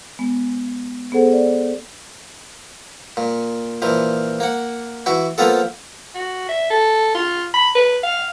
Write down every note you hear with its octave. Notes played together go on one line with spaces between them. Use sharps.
G#3 B3
B3 G#4 A4 C5 F#5
D5
A#2
A#2 E3 F3
A#3 F#5
E3 E4 F#4
F3 A#3 B3 F4 A4
F#4
E5
A4
F4
B5
B4
F5